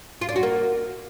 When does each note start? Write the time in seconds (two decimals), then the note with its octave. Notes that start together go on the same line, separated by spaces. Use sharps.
0.21 F4
0.29 D4
0.36 F#4
0.43 A#3